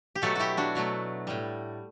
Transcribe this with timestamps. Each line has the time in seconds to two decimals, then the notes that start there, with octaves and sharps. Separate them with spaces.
0.15 G4
0.22 B2 F#3 A3 F#4 A4
0.35 E4 F#4 G4
0.57 D4 F#4
0.75 B2 F#3 A3
1.27 A2 G3